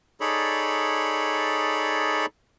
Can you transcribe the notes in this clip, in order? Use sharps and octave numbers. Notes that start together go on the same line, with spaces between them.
D#4 G#4 A4 C#5 D5 B5